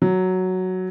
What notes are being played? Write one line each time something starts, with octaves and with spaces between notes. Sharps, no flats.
F#3